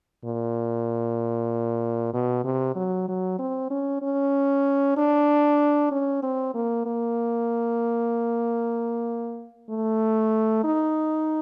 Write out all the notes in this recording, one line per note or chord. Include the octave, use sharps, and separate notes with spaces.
A#2
B2
C3
F#3
F#3
C4
C#4
C#4
D4
C#4
C4
A#3
A#3
A3
D#4